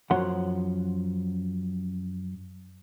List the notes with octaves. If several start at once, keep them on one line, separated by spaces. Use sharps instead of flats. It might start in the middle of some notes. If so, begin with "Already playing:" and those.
F#2 F3 C#5 F#5 C6